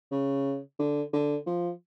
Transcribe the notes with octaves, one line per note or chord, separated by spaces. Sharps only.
C#3
D3
D3
F3